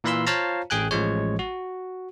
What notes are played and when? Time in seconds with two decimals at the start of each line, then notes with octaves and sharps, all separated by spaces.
0.04 A#2 E3 F5 B5 C6 E6
0.27 F4 C5 C#5 F5 A5 A#5
0.70 A1 G#4 G5 G#5 F#6
0.91 A1 F3 G#3 C#5
1.39 F#4